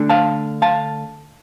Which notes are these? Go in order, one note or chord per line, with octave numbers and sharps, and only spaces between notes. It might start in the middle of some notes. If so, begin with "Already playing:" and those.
Already playing: D3 A3 D4
F5 A5
F5 A5